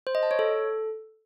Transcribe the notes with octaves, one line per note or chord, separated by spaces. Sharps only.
C5
D#5
A5
C#5
A4